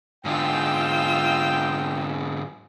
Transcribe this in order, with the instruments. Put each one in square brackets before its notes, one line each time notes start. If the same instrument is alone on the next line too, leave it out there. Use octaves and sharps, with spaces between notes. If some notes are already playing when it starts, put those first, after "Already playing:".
[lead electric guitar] G#2 D3 [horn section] G#3 D#5 G5 [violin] F4 E6